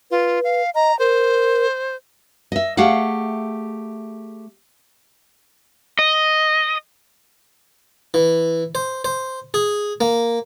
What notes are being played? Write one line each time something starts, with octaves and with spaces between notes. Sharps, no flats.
F4 B4
F5
D#5 A#5
A#4 C5
D#5 E5
A3 G4 G#4 F5 F#5
D#5
E3
C5
C5
G#4
A#3